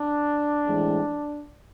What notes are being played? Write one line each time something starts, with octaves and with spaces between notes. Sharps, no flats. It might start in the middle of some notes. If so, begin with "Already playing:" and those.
Already playing: D4
A2 E3 G#3 C4